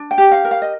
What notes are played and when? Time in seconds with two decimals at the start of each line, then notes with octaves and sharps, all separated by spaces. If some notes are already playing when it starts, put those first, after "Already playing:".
Already playing: D4
0.11 G5
0.18 G4
0.31 F5
0.45 A#4
0.51 F5
0.62 D#5